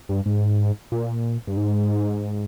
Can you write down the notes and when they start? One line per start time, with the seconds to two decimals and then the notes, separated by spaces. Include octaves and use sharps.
0.09 G2
0.26 G#2
0.92 A#2
1.47 G2
1.57 G#2